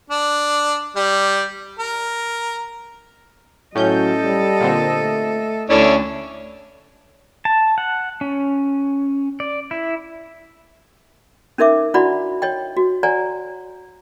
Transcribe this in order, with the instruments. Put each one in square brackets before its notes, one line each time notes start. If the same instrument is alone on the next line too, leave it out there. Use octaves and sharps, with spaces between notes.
[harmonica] D4
G3
A#4
[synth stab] A2 C#4 G6 [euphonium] F#3 [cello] A4 D#5
[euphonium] G3
[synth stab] A#2 D3 C4
[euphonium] A3
[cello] D2 [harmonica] C#4 D4 [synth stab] E4 A4
[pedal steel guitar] A5
F#5
C#4
D5
E4
[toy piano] C#4 D#4 A#4 E5 D6
D4 E4 F#4 D5 F#5 B5
C#5 D#5 G5
F#4
C#5 D5 F#5 G#5 A#5